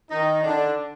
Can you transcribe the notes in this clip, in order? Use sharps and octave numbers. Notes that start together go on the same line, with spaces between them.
D#3 D#4
D3 D4